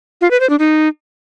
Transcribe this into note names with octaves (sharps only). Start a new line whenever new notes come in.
F4
B4
C5
D4
D#4